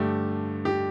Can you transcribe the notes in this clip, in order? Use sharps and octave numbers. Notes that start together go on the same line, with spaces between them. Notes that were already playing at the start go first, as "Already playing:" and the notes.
Already playing: G2 D3 A3 G4
G4